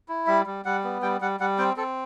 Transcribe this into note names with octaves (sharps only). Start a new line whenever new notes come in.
E4
G3 E5
G3
G3 F#5
B3
G3 G5
G3 F#5
G3 F#5
C4 G5
C4 A4